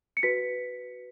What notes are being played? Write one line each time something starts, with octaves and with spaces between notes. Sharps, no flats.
C#7
F#4 B4 B6